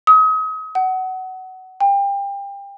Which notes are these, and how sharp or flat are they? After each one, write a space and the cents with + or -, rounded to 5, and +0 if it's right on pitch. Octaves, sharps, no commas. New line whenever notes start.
D#6 +35
F#5 +20
G5 +30